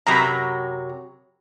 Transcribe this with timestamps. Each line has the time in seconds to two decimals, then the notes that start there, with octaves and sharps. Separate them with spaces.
0.07 F#2 C3 F#3 A#5 B5